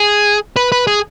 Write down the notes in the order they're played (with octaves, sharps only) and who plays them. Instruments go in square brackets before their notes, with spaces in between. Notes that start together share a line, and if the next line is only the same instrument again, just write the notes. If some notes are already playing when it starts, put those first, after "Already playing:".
Already playing: [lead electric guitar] G#4
B4
B4
G#4